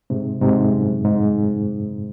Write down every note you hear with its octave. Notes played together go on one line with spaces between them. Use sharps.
G#2 C3
G#2 C3
F#2
G#2